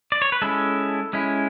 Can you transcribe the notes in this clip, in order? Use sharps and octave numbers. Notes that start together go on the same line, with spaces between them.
D5
C#5
B4
G#3 C#4 E4 A4
G#3 C#4 E4